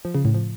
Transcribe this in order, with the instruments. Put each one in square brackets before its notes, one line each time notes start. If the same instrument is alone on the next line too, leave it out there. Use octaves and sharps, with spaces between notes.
[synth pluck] F3
C#3
A2
F3